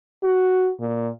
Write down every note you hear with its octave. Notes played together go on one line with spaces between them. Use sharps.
F#4
A#2